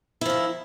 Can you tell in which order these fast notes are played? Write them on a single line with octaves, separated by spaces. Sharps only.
E4 F3 D#3